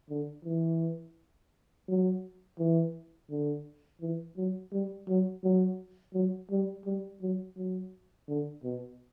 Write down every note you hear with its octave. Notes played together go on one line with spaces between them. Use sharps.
D3
E3
F#3
E3
D3
E3
F#3
G3
F#3
F#3
F#3
G3
G3
F#3
F#3
D3
B2